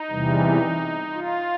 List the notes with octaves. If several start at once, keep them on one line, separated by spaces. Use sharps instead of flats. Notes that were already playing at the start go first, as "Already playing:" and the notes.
Already playing: D#4
E2 C3 E3 G3
F4